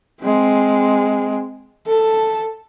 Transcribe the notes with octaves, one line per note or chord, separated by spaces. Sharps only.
G#3 C4
A4